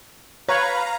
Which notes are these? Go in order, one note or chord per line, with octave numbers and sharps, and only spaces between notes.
B4 C#5 F5 A#5